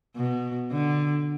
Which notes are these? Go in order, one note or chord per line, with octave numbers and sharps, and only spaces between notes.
B2
D3